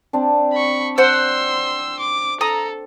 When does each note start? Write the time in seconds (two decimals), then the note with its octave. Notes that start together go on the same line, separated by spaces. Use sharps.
0.13 C4 D4
0.53 B5 C#6
0.98 C5 F#5 C6 E6
2.00 D6
2.41 A4 A#5 D#6